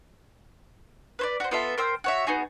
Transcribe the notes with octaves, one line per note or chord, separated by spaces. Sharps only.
B4 C5 D5
F#4 C5
B3 F4 A4 E5
A#4 C5 G5 E6
F#4 C#5 E5
B3 D#4 F#4 G#4